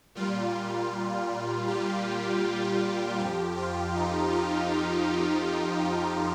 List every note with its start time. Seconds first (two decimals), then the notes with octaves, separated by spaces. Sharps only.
0.15 A#2 G3 F4
1.68 G4
3.19 F2 F3 G4
3.57 F4
3.95 D#4
4.33 F4
4.71 F4